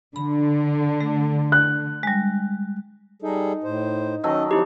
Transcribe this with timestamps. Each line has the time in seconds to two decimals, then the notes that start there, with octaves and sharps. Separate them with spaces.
0.16 D3 B5
1.00 A3
1.52 F#6
2.03 G3 G#3
3.22 G3 D#4 G#4 A4
3.64 A2 C5
4.24 D#3 F#3 C#4 A4 D#5
4.51 F3 C4 D#4 E4 G4